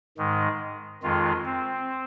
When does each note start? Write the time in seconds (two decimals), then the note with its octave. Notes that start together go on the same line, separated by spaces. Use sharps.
0.18 G#2 D#3 G#3
1.03 F2 D#3 G#3 F4
1.45 C4